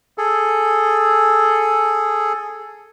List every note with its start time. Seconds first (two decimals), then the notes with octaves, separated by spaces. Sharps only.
0.18 G#4 A4